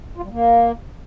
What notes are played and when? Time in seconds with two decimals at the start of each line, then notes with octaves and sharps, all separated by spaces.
0.17 F4
0.24 G3
0.31 A#3